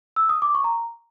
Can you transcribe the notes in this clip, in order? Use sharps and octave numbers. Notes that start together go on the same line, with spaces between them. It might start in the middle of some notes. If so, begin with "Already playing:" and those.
E6
D#6
D6
C#6
A#5